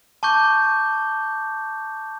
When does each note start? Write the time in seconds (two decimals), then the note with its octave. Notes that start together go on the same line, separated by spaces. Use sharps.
0.23 A5 C#6 D6 G6